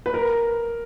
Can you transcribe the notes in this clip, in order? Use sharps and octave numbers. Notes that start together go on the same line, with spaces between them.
B4
A#4